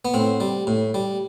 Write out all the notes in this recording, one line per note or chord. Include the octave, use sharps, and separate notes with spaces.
B3
A2 C4
G3
A2
G3